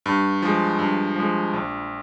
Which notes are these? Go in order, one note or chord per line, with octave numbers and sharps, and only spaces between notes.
G2
F3 G#3
G2
F3 G#3
A#1